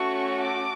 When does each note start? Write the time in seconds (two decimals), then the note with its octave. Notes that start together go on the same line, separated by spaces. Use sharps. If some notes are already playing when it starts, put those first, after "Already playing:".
Already playing: A3 C#4 F#4 C#6
0.42 D6